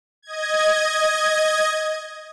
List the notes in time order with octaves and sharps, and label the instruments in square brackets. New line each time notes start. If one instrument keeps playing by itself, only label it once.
[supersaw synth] D#5 G#6